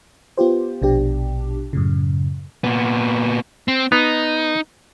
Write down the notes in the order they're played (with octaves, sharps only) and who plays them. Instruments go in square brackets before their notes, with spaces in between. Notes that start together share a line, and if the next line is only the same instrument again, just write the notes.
[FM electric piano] B3 F4 G4 C5
A#1 B2 D4 G4
F#2 A2 C#3
[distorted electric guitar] A#2 B3
[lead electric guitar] C4
[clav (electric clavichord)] B3 [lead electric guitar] D#4